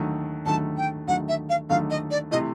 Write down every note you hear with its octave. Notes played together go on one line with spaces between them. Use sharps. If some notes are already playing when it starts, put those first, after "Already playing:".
Already playing: D#2 D3 F#3 A3
D#2 D3 F#3 A3 A5
G5
D#2 D3 F#3 A3 F#5
E5
F5
D#2 D3 F#3 A3 F5
D#5
D5
C3 E3 A3 D#5